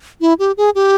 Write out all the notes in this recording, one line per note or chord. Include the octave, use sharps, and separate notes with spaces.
E4
G4
G#4
G4